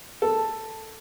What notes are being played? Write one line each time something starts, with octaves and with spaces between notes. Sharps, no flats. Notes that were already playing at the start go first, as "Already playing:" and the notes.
A4